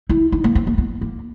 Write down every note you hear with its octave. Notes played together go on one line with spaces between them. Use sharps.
E4
D#4
A#3
C4
A#3
B3
A#3